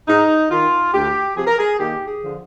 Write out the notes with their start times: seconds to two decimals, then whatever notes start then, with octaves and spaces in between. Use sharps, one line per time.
0.08 G#2 D#4
0.51 D#3 F4
0.93 D2 G4
1.36 C3 F3 G#4
1.47 A#4
1.58 G#4
1.79 D#2 G4
2.08 G#4
2.21 D3 F3